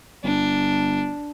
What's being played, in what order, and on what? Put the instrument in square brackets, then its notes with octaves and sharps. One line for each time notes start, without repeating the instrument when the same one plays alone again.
[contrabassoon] G1 [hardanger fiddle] D4